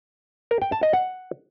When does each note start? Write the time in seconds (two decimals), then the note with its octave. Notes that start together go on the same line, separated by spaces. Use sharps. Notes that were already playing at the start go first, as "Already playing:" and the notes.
0.51 A#4
0.62 G5
0.72 A5
0.83 D#5
0.93 F#5